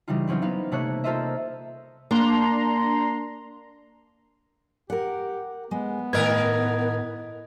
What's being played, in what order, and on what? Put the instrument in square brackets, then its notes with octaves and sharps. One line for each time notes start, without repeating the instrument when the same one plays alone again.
[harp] C#3 E3 G3 D#4 F4
F#3 C4 C#4 D#4 F4
B3 D#4 F5
C3 A3 A#3 C#5 F#6 G#6
F4 A4 A#4 C5 D#5 E5
[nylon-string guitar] A#3 [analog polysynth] D4 A#5 C6
[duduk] G4 [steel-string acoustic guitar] A#4 F#5
[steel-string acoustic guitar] G#3 [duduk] B3
[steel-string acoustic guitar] A2 [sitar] D#3 A#4 B4 [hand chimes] D#5 G#6